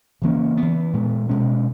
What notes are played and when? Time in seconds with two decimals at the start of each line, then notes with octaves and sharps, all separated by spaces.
0.22 C#3 E3 A#3 C#4
0.57 B3
0.62 E3
0.93 A#2 G#3 B3
1.29 B2 G#3 C#4